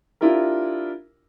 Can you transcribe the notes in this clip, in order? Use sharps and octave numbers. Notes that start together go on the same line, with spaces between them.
D4 E4 F4 G4 A#4